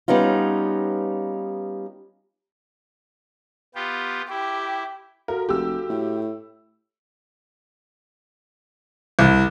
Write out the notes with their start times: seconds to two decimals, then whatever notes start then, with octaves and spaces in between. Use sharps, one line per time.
0.08 G3 B3 C#4 D#4 F4
3.75 B3 F4 G4
4.30 E4 G4
5.28 F#4 A4 A#4 F5
5.49 F1 G4 E6
5.90 A2
9.19 C2